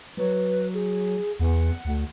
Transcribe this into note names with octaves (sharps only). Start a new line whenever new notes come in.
F#3 B4
G#4
E2 F#5
D2